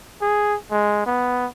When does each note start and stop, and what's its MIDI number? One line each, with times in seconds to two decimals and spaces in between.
0.22 0.56 68
0.71 1.02 56
1.06 1.47 59